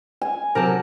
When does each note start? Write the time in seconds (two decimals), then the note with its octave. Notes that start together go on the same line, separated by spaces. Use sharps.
0.22 G#5
0.55 C3 F#3 G4 A#4 A5